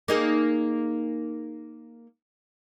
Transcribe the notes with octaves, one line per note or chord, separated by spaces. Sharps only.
A#3 D#4 G#4